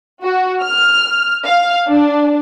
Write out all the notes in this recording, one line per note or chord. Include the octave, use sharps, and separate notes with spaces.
F#4
F6
F5
D4